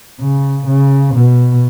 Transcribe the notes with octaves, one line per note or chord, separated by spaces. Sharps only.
C#3
C#3
B2